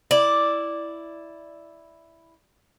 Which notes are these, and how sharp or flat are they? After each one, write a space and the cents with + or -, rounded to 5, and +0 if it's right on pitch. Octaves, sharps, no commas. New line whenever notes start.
E4 +0 D5 +0